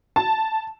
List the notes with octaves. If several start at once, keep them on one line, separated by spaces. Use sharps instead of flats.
A5